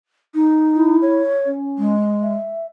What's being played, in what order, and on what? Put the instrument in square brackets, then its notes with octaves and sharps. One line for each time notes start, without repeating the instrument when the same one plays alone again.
[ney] D#4
[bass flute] E4
[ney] C#5
[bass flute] C#4
[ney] G#3
[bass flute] E5